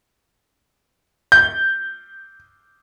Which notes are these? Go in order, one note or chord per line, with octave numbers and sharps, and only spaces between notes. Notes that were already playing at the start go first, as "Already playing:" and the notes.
G6